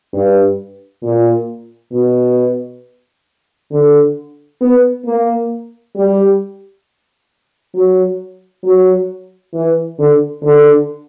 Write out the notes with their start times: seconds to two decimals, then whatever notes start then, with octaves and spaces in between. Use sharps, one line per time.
0.13 G2
1.03 A#2
1.93 B2
3.72 D3
4.61 B3
5.05 A#3
5.96 G3
7.74 F#3
8.64 F#3
9.54 E3
9.99 D3
10.43 D3